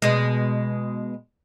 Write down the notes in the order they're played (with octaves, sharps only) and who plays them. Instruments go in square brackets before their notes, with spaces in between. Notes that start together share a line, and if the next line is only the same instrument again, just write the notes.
[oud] B2 G#3